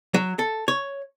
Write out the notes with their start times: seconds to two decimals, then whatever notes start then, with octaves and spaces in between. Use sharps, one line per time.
0.14 F#3
0.39 A4
0.68 C#5